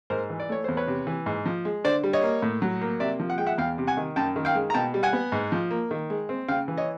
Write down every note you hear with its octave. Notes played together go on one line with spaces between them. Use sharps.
G#2 A#4 C5
E3
D5
A3 C#5
E2 C5
B4 C#5
C3
E3
G#2
F3
G#3
D3 C5 D5
G3
C#5 D#5
A#3
A2
F#3
A#3
C3 D5 E5
F3
F#5
G#3 G5
E5 F#5
E2 F5 G5
C3
F#5 G#5
D#3
F#2 G5 A5
D#3
F5 G5
G#3
A#5
B2 G5 A5
G3
F#5 G#5
B3
G#2
F3
A#3
D#3
G#3
C4
C#3 F5 G5
E3
C#5 D#5